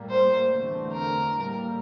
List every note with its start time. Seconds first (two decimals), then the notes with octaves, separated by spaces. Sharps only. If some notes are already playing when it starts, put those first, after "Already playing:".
Already playing: A2 G3 A#3
0.10 C5
0.51 E2 D3 A3 C4
0.92 A#4
1.34 A2 G3 A#3